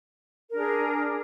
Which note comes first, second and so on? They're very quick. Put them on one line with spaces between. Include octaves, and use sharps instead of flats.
A#4 D4 G#4